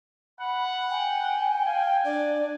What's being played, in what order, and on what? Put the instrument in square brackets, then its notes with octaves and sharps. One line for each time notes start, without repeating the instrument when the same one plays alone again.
[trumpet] F#5 [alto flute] B5
[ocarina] G5 [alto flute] G#5
[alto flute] F5 [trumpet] G#5
[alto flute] D4 [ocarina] D5